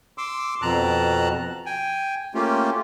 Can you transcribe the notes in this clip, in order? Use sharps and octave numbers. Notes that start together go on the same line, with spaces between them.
C6 D6 E6
F2 B2 A5 A#5 F#6
G5 G#5
A3 A#3 C#4 F4 G4